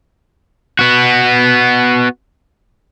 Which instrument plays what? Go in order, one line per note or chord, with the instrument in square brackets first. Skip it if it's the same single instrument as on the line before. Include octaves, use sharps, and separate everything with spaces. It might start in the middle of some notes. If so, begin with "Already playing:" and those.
[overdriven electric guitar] B3 F#4